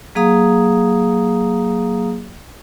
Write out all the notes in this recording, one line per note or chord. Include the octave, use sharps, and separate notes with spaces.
F#3 A#3 G#4 F5 A#5 D#6